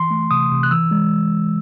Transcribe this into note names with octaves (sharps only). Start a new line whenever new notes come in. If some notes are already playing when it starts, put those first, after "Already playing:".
Already playing: E3 C6
A3
C3 D#6
C3
F#6
E3 E6
G#3